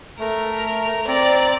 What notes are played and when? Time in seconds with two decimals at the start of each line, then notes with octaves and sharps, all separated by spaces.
0.19 A3 A#4
1.08 C4 D5 A#5